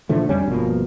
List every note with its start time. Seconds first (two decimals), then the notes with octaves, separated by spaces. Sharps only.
0.09 A#2 D3 F3 A3
0.29 F2 G3 C#4 D4
0.46 G1 B2 F3 A#3